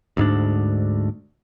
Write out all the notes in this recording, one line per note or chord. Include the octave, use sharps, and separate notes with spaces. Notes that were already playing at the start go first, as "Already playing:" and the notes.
D2 G#2 D4